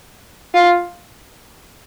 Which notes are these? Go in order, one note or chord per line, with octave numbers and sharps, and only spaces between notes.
F4